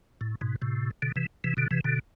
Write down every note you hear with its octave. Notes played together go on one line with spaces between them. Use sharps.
A2
G#2 B2
A2 C3
B2 D3
C3 E3
C3 E3
B2 D3
C3 E3
B2 D3